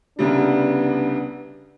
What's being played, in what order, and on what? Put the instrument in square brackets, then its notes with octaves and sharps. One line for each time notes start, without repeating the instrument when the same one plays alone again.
[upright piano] C2 C#3 G3 [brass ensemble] B3 D4